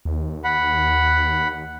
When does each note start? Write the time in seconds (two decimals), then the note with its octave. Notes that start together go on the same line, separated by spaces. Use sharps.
0.05 D#2
0.44 F#5 B5